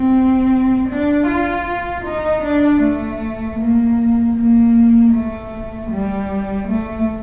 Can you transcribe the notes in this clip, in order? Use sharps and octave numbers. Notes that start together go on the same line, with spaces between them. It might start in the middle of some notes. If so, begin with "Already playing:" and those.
Already playing: C4
D4
F4
D#4
D4
A3
A#3
A#3
A3
G3
A3